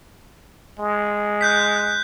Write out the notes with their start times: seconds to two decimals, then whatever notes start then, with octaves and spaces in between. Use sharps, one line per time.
0.79 G#3
1.41 F#6 G6 B6